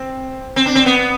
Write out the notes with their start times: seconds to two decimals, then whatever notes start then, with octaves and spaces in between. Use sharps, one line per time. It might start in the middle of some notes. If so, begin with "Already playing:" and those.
Already playing: C4
0.56 C4
0.66 D4
0.75 C4
0.86 B3